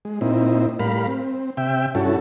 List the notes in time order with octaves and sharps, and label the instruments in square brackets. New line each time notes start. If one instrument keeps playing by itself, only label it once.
[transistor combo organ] G#3
A#2 C4 D#4 E4
A2 G3 A#4 F5 B5
C4
C3 E5 G5
G2 C#4 E4 F#4 A4